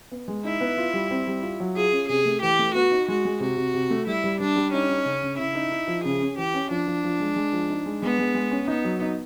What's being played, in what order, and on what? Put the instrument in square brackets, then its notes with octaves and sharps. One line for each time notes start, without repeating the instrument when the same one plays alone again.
[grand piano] B3
G#3
[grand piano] D#4 [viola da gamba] E4
[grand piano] B3
F4
G3
C4
G3
F4
F#3
[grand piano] F4 [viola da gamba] G#4
[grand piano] C#4
[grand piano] C3 [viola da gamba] G#4
[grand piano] A3
[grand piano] E3 [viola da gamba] G4
[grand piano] A3
[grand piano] B3 [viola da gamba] F#4
[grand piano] D#4
[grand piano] G#3 [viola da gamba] F#4
[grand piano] G#3
[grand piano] C3 [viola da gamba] F#4
[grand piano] C3
C3
A3
[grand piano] G3 [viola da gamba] E4
[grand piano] G3
[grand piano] G3 [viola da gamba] D4
[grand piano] G3
[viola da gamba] C#4 [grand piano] D#4
[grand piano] D#4
C#3
C#3
[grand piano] C#3 [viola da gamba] E4
[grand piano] D#4
D#4
F3
[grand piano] C#3 [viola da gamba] G#4
[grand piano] C#4
[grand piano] E3 [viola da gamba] G4
[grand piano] C#4
[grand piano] F3 [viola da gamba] D4
[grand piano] F3
F3
G#3
G#3
F3
D#4
G#3
[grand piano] G#3 [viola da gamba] B3
[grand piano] G#3
G#3
C#4
[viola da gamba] B3 [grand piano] D#4
[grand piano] F#3
D#4